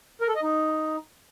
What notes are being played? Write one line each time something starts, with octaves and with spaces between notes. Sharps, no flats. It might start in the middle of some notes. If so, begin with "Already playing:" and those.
A#4
A4
D#5
D#4